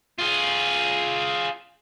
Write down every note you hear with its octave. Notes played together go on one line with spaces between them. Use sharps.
F4 G#4